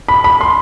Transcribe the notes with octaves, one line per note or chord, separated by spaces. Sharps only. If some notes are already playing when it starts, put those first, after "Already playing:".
B5
B5
C6